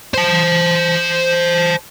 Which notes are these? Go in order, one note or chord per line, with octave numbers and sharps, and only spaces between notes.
C5 A5